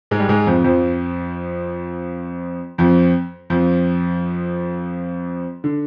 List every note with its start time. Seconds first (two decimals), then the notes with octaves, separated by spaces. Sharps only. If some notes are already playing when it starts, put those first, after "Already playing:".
0.11 G#2 G#3
0.19 G3
0.29 G#2 G#3
0.47 F2 F3
0.64 F2 F3
2.78 F2 F3
3.50 F2 F3
5.64 D3